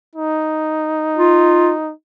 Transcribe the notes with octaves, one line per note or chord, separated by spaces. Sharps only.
D#4
F4